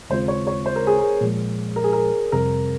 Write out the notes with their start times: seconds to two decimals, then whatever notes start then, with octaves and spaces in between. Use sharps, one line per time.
0.10 D#2 C#3 G#3 C4 F4 C5
0.28 C#5
0.47 C#5
0.66 C5
0.76 A#4
0.87 G#4
0.98 A#4
1.21 A#2 F3 G#3
1.76 A#4
1.84 G#4
1.93 A#4
2.32 F2 C3 G3 C4 A#4